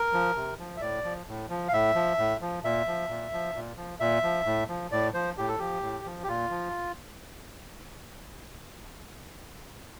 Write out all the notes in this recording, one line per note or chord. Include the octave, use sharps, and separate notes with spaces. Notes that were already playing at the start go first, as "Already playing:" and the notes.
Already playing: A#4
F3
C3
F3
E5
A2 D5
F3
A2
F3
F5
A2 E5
F3
A2
F3
A#2 E5
F3
A#2
F3
A#2
F3
A#2 E5
F3
A2
F3
A2 D5
F3 C5
A2 G4
A4
F3 G4
A2
F3
G4
A#2 F4
F3